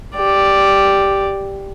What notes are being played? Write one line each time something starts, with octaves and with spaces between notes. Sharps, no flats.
G4 D5